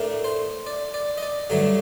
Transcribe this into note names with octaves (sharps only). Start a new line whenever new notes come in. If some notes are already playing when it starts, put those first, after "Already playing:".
Already playing: A2 A3 D4 A#4
C5
D5
D5
D#5
D5
G2 D3 F#3 A3 D4